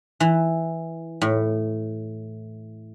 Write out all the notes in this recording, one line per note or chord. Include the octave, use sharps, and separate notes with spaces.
E3
A2